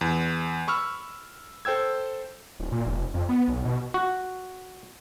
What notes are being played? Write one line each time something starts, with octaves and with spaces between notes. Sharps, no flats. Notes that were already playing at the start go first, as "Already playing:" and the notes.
E2
B5 C#6 E6 F6
A4 C5 G5 E6 G#6
D1
A#2
F1
F2
B3
B1
B2
F#4